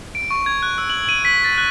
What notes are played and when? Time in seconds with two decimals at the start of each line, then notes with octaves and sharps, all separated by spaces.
0.15 D7
0.30 C#6
0.46 G#6
0.63 F#6
0.78 E6
0.90 F#7
1.09 D#7
1.25 B6
1.44 A6
1.58 F#6